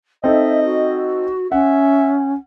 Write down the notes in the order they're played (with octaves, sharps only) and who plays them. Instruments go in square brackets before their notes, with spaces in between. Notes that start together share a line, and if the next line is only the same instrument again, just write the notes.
[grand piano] C4 D#4 A4 [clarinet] D#5 [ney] E5
[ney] F#4
[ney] C#4 [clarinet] E5 [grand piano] F#5